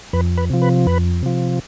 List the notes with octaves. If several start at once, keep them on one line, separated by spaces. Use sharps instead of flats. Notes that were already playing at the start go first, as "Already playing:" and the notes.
F2 B4
B4
C3 F3
B4
F2 B4
C3 F3